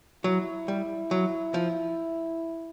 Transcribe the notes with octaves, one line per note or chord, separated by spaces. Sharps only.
F#3 E4
G3
F#3
F3